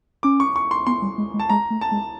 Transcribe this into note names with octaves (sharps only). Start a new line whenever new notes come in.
C#4 D6
C#6
C#6
C6
B3 C6
G3
G#3
G#3
A5
G#3 A#5
A3
A5
G#3